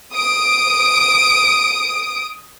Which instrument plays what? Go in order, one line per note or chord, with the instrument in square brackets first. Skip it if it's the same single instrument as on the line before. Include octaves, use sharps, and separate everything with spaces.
[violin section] D#6 D7